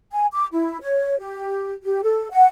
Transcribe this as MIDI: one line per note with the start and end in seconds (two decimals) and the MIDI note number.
0.12 0.26 80
0.32 0.46 86
0.52 0.78 64
0.82 1.18 73
1.19 1.73 67
1.84 2.00 67
2.03 2.28 69
2.32 2.47 78